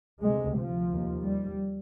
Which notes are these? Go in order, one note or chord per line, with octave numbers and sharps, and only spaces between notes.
D2 C3 G#3
F3
D#2
G3